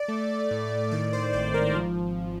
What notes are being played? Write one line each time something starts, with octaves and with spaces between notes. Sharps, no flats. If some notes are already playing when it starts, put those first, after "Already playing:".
Already playing: D5
A3
A2
D#3 D5
C5
G#1 C5
A#4
F3